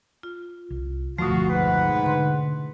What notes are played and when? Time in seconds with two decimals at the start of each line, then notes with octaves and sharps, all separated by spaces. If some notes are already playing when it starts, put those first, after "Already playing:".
0.23 F4
0.70 C2
1.18 F#1 D2 B2 F3 A3 F4 F#4
1.49 G#2 B4 F#5
2.06 D3 C6